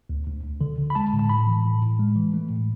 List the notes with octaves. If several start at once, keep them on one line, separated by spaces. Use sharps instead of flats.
D2
D2
D2
D3
D3
B5
G#3 A5
A2
A5
A2 B5
E3
A2
A2
G#3
E3
A3
A2